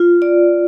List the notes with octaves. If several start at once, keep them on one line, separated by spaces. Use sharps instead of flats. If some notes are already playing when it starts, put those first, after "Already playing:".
Already playing: F4
D5